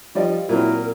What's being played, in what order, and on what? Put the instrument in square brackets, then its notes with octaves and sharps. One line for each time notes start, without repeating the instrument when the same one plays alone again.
[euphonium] F3 [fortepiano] G3 D5 D#5
[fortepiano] A#2 F#3 C4 [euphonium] E4 [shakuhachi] A#4